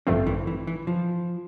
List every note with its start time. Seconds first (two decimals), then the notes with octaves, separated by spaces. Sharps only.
0.07 A1 G2 D3 F3 A3 C4
0.26 E3
0.47 E3
0.67 E3
0.87 F3